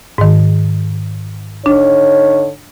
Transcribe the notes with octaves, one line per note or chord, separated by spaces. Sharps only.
G#2 D#3
D3 D4 D#4 C#5